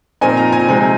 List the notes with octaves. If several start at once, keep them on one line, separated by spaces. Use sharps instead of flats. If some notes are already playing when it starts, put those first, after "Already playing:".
A#2 F3 C4 D#4 G#5
A#5
G#5
C3 F3 G#3 C4 D#4 G#5